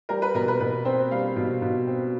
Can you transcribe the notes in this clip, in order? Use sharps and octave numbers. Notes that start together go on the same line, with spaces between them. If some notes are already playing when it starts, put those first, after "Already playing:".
G3 A#4
B4
B2 A#4
B4
B2 B4
C4 C5
G3 F5
B2
B2
C4